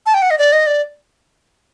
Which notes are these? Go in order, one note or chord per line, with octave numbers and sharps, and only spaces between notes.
A5
G5
F#5
D#5
D5
D#5
D5